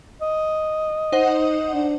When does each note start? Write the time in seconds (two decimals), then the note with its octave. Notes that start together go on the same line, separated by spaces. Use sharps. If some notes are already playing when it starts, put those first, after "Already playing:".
0.21 D#5
1.12 D#4 C5 F#5
1.74 D4